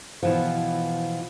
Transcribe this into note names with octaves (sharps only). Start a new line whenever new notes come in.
B2 E3 F3